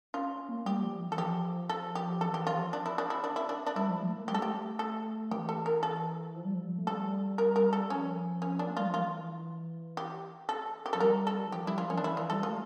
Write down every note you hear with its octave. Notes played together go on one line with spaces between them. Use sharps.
C#4 F4
C#4
A#3
G3 G4
F3
E3
A4
F3 G4
A4
G4
E3 A4
G4
F3 F4
D4
E4
D4
E4
D4
E4
D4
D4
G3 E4
F3
A3
A#3
A3
G4
G3
A4
A3 G4
A4
E3 G4
A4
A#4
A4
F3
G3
F3
A3
G3 A4
A#4
A#4
A4
F3 C#4
C#4
A#3 D4
A3
G3 F4
F3
E3 F4
G4
A4
G4
F3 A4
G3 A#4
A4
E3
F3 G4
G3 E4
F3 F4
E3 C#4
D4
E3 E4
E3 F4
G3 A4
A3 F4